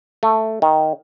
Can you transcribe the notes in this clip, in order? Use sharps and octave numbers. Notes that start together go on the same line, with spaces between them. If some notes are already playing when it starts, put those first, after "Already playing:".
A3
D#3